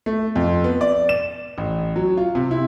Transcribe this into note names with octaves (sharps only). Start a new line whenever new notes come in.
A3
F2
B3
D5
E7
A1
F#3
F4
C3
E4